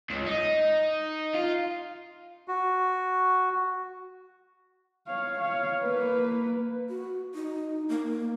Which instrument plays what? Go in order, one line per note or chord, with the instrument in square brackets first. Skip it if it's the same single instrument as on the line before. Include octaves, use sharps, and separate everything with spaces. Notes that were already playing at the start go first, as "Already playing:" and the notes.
[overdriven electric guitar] C#2
D#4
F4
[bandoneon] F#4
[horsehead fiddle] C#5 F5
C#5 F5
A#3 B4
[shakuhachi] F#4
D#4
A#3